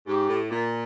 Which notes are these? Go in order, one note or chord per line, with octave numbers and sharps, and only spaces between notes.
G#2 G4
A2
A#2